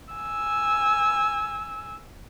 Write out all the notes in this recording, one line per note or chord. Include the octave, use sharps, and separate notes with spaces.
G#5 E6